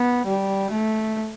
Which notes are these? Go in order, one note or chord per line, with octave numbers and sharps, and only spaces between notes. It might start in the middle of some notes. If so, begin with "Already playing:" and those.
Already playing: B3
G3
A3